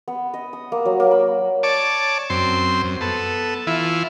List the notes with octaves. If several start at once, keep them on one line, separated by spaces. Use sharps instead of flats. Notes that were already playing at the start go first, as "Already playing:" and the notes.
B3
D#5
D#6
A#3
F#3
A#3
B5
C#5 D5 A5 D6
F#2 C4 C6
F#2
B3 A4
E3 E4 F4